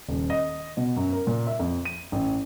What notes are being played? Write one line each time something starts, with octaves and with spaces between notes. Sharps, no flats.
D#1
D#5
B2
F#2
A#4
A#2
E5
F2
D#7
A1